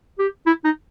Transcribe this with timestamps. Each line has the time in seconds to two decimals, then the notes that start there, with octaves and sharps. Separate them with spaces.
0.19 G4
0.46 E4
0.64 D#4